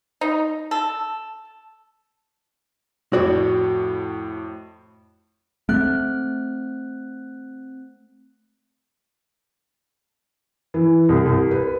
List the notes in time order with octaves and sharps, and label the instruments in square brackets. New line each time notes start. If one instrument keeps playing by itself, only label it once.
[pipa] D#4
A4
[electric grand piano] F2 A2 [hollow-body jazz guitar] F#4 C#5 D5
[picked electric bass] A3 [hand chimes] C4 F#6
[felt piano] E3
C2
C2
B4